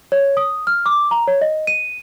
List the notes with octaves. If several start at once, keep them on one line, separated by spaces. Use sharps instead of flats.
C#5
D#6
F6
D6
A#5
C#5
D#5
D#7